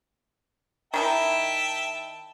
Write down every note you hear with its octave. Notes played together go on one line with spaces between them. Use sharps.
D#3 D#4 E4 E5 G5 A5